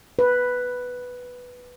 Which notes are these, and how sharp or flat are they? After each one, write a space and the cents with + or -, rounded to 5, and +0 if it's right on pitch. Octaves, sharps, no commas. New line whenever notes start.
B4 +0